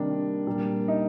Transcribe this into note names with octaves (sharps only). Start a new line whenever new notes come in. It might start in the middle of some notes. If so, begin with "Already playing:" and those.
Already playing: C3 D#3 G3 A#3 D4
A#2 G3 A#3
D#4